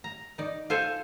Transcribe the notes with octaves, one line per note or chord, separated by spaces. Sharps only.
A#5
D#4 D5
F4 A4 C5 G#5 A5